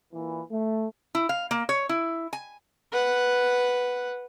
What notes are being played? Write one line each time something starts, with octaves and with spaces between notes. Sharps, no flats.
A#2 E3
A3
E4
F5
A#3
C#5
E4
G#5
B4 F#5